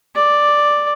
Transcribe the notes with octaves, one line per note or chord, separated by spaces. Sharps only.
D5